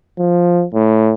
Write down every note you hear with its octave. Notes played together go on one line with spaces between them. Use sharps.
F3
A2